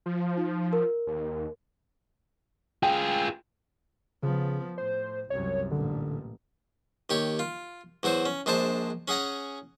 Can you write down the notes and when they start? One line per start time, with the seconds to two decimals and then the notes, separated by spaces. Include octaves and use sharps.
0.06 F3
0.38 D#4
0.73 A#4
1.07 D#2
2.83 F4 G#4 G5
4.23 C#3 F3 B3
4.78 A2 C5
5.30 C2 F#2 C#5
5.71 A1 A#2 D3
7.10 D#2 G4 C#5
7.39 F4
8.03 E2 F#3 F#4 C5
8.26 C#4
8.46 A#1 G#3 D4 C5 A5 D6
9.08 C#4 G#4 F#5 G#5 A#5